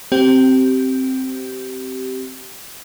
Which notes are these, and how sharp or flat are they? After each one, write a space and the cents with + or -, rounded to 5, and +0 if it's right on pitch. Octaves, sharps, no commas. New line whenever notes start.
C4 +0 G4 -25